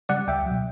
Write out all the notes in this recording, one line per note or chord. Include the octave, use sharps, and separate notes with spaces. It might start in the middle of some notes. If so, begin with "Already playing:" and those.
C#3 G3 D5 F#5
C#2 E5 G5
B2 F#3